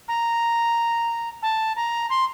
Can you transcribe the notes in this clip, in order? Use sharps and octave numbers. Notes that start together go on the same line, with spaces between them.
A#5
A5
A#5
C6